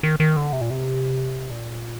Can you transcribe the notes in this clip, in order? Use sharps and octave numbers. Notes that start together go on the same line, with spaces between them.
D#3
D#3
D3
C3
A#2
C3
A#2